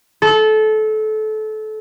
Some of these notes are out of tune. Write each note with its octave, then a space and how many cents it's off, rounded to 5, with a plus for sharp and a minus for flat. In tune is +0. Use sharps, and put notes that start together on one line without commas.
A4 -25